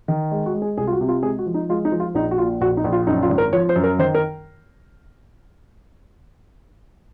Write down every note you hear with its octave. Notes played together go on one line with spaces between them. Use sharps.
D#3
G#3
F#4
G#3
G#4
C2 G#4
F4
F#4
C3
F4
G#3 G#4
F#4
F3
D#4
G#3 F4
D#4
F3
F4
A#1 D#4
F#4
A#2 F4
A#1 F#4
D#4
A#1
F4
F#2 D#4
F4
G#1
A#4
F3 C#5
C5
F#2
A#4
D#3 C5
A#4